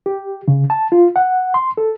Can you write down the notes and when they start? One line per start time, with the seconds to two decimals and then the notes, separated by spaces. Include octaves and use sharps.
0.06 G4
0.48 C#3
0.70 A5
0.92 F4
1.16 F#5
1.54 C6
1.77 A4